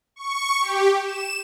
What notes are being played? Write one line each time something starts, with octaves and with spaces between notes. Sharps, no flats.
C#6
G4
E7